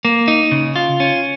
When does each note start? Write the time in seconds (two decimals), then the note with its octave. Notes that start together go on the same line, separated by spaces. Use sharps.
0.05 A#3
0.28 D#4
0.52 C#3
0.76 F4
1.00 C#4